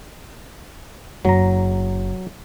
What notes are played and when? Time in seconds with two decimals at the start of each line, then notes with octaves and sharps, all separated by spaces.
1.25 F#1 F#3 A#5